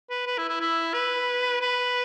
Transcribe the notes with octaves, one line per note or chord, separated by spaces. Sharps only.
B4
B4
E4
E4
E4
B4
B4